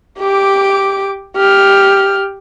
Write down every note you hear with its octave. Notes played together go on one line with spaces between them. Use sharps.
G4 D6
G4 F6